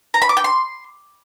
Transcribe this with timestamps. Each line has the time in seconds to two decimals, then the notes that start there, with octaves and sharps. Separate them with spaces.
0.14 A#5
0.22 B5
0.29 D6
0.37 G5
0.44 C6